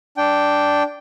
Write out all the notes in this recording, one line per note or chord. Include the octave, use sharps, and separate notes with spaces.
D4 G5